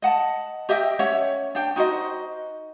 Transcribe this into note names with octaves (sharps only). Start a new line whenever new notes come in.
D#5 F#5 A5
G4 D#5 E5 G5
C#4 C#5 E5 F#5
D4 G5
D#4 F#4 C5 D#5